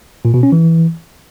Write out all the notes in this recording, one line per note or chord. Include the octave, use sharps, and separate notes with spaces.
A#2
B2
C#4
E3